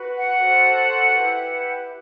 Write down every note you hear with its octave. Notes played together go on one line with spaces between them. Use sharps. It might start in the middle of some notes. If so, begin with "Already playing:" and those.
Already playing: F#4 B4
F#5
F#4 A4 C5
E4 G4 B4